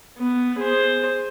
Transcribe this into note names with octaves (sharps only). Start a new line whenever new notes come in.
B3
G#4 C5